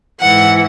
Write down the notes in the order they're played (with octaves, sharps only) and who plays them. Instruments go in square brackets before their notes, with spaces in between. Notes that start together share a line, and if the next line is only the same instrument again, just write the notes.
[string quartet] G#2 E3 F#5